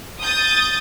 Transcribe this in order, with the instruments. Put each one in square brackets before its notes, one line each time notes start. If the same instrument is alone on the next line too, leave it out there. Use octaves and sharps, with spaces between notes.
[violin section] D#6 G6 A6